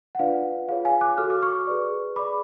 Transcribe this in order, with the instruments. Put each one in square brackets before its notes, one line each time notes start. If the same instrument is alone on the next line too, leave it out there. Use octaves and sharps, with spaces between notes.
[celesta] F#5
D4 F4 B4 D5 F5
F4 G#4 C#5 F5
F5 G#5
D6 F#6
F#4 A4 C#5 F6
D6
C#6 F6
G#4 B4 D5
G#4 D5 B5 D6